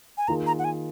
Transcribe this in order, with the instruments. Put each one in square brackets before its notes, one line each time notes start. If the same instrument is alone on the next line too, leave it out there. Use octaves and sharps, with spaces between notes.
[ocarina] G#5
[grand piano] D#3 A#3 F4 G#4 [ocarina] A#5
[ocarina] A#5
F#5
G#5